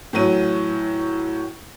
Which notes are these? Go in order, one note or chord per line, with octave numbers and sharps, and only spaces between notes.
A2 E3 F#3 D#7